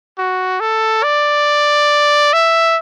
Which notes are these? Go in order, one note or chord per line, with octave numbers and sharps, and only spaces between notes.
F#4
A4
D5
E5